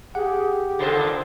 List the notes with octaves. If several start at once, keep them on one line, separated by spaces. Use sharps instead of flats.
G4 G#4 F#5
A#2 C#3 A4 C5